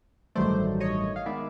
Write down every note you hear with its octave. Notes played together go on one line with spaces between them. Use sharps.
A1 G2 D#3 F#3 A3 C5 D5
C#5 D#5
F5
D#3 G#3 B3 D5 E5